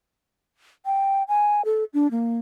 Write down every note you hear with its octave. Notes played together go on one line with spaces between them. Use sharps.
G5
G#5
A4
D4
A#3